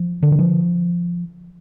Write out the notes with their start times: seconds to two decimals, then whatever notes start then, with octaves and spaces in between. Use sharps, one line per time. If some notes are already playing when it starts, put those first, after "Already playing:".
Already playing: F3
0.23 D3
0.32 E3
0.39 F3